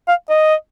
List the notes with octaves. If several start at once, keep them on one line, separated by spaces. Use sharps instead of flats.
F5
D#5